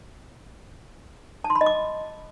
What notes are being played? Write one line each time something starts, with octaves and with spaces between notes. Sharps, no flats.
A5
C6
B5
D#5
D6